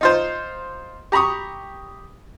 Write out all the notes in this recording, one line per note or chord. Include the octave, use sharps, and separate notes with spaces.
D#4 F4 C5
G4 A#5 B5 C#6 D#6